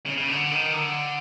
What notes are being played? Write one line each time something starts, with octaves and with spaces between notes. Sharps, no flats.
C#3
C#3
D3
D#3
D3